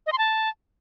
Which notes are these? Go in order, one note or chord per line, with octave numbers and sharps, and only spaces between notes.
D#5
C6
A5